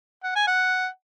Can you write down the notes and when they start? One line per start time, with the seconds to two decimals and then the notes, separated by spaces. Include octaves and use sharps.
0.24 F#5
0.35 G#5
0.47 F#5